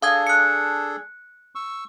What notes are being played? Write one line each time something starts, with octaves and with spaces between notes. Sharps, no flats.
D4 G#4 A4 F5 D#6 G#6
F#6 C#7
C#6 E6